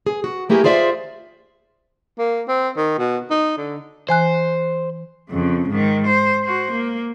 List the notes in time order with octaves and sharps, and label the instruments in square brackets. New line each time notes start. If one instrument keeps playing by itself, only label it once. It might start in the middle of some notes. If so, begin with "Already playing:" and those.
[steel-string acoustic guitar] G#4
F#4
A3 A#3 E4 G4 G#4 A#4
F4 G#4 C5 D5 E5
[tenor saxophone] A#3
C4
D#3
B2
D#4
D3
[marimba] E3 G#5 F#6 [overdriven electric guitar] C5
[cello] F2 C#3
G#2 D#3
C5
F#4 C5
A#3